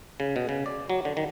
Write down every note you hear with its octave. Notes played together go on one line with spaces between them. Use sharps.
C#3
B2
C#3
D5
F#3
D3
D#3